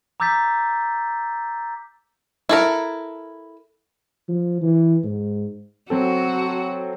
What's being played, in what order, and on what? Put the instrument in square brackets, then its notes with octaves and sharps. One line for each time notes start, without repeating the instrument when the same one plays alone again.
[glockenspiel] A#5 D6 E6 G6 A6 B6
[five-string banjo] E4 A4 A#4
[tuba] F3
E3
G#2
[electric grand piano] F#3 C4 A4 [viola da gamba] F#4